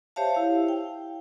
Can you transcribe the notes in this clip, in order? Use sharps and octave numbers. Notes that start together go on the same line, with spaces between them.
G4 C5 C#5 E5 F5 A5
E4 F5
G5